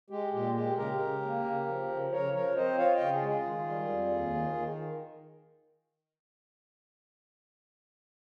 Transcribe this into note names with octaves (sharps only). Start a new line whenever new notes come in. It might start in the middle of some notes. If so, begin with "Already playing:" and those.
G#3 G4
A#2 G4
G#3 G4
C#3 G4 A#4
C#3
A#3
C#3
F3
C#3
C#3 A#4 C#5
F3 A#4 C#5
C4 C5 D#5
F4 C#5 F5
D#5 G5
C#3
F4 G#4
G#3
F4 G#4
D#3
G3
F2
D#2
D#3
D#3